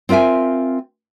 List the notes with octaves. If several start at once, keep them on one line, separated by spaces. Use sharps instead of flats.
C4 F4 A#4 E5 G#5